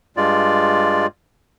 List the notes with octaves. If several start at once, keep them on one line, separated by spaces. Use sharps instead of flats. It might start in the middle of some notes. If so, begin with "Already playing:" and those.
G2 G#3 F4 D5